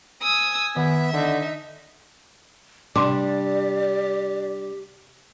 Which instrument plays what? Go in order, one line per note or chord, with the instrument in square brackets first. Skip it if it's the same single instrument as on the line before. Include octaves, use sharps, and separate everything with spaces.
[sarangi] G#5 [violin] D#6 E6
[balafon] D#3 [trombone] B3 [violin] E5
[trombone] D3 [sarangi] D#4
[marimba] C3 C6 D6 [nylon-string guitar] G3 D4 [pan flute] G4 [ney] D5